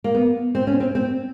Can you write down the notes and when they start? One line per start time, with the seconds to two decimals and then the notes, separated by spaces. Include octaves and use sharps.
0.04 A#3
0.15 B3
0.55 C4
0.67 C#4
0.80 C4
0.95 C4